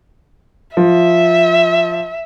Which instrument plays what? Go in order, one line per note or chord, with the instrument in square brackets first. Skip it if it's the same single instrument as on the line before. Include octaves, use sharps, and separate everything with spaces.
[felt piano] F3 [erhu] E5